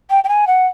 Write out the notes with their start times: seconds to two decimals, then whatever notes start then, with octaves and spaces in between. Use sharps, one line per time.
0.10 G5
0.24 G5
0.29 G#5
0.47 F#5